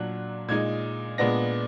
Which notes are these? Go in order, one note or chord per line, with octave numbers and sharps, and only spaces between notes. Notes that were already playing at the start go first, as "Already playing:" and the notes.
Already playing: A#2 F#3 D4 F#6
A#2 G#3 D#4 G#6
A#2 G#3 B3 D4 A#6